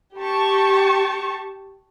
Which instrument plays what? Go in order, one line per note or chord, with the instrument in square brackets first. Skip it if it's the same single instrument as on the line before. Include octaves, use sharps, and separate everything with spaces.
[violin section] G4 A5 C#6